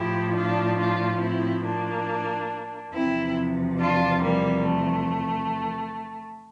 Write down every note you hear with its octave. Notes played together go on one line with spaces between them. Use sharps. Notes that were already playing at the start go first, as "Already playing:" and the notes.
Already playing: A2 F3 E4 G4
D4 F4
D4 F4
C4 E4
A#3 D4
E2 C3 F3 C4 E4
D4 F4
G3 A#3
A3